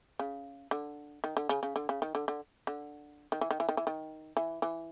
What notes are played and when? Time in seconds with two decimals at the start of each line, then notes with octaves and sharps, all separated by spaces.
0.19 C#3
0.71 D3
1.24 D#3
1.37 D3
1.49 C#3
1.63 C#3
1.76 D3
1.89 C#3
2.02 D#3
2.15 D3
2.28 D3
2.67 D3
3.32 D#3
3.41 E3
3.51 D#3
3.60 E3
3.69 D#3
3.77 E3
3.87 D#3
4.37 E3
4.62 E3